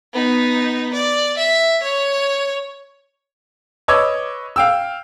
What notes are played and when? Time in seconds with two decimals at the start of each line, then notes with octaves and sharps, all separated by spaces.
0.14 B3 D#4
0.93 D5
1.37 E5
1.83 C#5
3.88 B4 C#5 D#5 D6 E6 G#6
4.56 F5 G5 E6